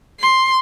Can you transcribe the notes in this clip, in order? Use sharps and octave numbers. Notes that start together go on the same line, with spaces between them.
C6